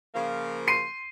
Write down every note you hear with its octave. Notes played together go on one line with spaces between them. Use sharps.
C#3 F3 A#3
C6 C7 D#7